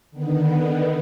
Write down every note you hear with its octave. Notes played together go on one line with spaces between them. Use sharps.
D3 D#3 B3